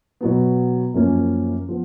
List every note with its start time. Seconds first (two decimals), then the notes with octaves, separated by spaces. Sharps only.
0.21 B2 F#3 B3
0.94 F#2 F3 A#3 C#4
1.69 F3 B3